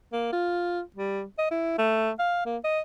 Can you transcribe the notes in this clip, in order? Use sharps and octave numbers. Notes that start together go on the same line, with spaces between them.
A#3
F4
G3
D#5
E4
A3
F5
A#3
D#5